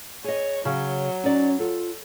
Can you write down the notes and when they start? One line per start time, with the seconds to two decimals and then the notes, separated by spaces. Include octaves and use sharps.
0.24 G#4 C#5 D#5
0.65 C#3 F#3
1.24 C#4 D#4 D5
1.60 F4 A4